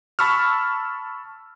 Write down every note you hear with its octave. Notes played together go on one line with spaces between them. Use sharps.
A5 B5 C#6 E6 F6